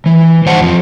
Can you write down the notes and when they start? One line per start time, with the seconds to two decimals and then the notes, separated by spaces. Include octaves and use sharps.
0.06 E3
0.46 G2 C5 F#5 A5
0.61 F2 F3